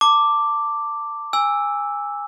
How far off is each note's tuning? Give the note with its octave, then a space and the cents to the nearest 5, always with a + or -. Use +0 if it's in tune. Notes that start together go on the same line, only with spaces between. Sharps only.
A5 +30 D6 +0
G#5 -20 E6 +0